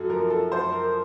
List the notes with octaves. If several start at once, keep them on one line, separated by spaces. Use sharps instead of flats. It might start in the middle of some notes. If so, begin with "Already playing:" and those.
Already playing: F#2 F#4 A4
F3 A#4
A4
F#2 C5
A#4